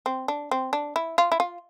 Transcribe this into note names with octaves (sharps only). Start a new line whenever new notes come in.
C4
D4
C4
D4
E4
F4
E4
F4